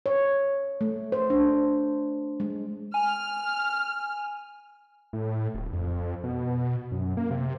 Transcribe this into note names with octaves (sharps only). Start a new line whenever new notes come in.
C#5
A3
C5
D4
G#3
G#5 F6
A2
D1
F2
B2
F#2
A#3
C3